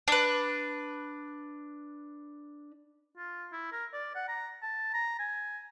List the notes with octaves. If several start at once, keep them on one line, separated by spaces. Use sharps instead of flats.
D4 B4
F4
E4
A#4
D5
F#5
A#5
A5
A#5
G#5